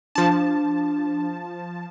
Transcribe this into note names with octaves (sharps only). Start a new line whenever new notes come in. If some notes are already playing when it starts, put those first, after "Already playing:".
F3 D4 A5